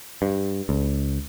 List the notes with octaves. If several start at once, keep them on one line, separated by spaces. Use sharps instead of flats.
G2
C#2